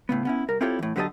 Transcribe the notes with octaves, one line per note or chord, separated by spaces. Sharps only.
A2 C#3 B3
B3 C#4 E4
C2 A#4
C4 E4 F4 G4 A4 C#5
A2 E3
D3 F#3 G4 B4 D#5 A5